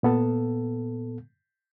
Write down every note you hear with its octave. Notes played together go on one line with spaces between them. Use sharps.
A#2 B3 A4